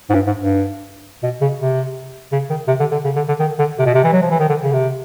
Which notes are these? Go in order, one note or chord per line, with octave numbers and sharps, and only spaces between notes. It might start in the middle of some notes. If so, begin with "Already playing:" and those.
G#2
G2
G#2
G2
B2
C#3
C3
C#3
D#3
C3
D3
D3
C#3
D3
D3
D#3
D3
C3
B2
C3
E3
F#3
F3
E3
D#3
D3
C#3
C3